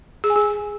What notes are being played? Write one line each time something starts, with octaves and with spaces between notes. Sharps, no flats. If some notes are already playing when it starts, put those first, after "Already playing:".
G#4
G#5
G#4